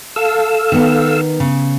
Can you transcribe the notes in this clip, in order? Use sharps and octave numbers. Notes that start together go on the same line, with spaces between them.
A4 F5 E6
D#3 B3
C#3